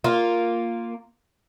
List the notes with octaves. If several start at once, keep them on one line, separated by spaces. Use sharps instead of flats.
A#3 F4